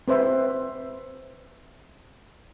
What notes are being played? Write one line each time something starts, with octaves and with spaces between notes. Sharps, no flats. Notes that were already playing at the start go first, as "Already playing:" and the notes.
C4 B4 C5 E5